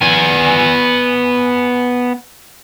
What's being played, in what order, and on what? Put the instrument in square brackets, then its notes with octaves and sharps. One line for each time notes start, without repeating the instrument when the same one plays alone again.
[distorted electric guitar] B3 G#5